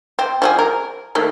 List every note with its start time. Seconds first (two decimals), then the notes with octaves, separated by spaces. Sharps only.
0.19 C4
0.42 F3 C4 G#4
0.59 A#4
1.15 D#3 A3 A#3